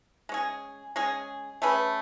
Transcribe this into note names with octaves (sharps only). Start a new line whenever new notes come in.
G#3 C#4 G#4
G#3 C#4 G#4
A3 C#4 G#4 B4